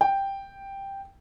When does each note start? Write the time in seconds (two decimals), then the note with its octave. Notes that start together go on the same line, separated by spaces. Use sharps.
0.01 G5